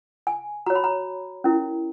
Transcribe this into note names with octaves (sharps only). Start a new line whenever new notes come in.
G#5
F#4 C#5 A#5
B5
A#5
C#4 E4 A#4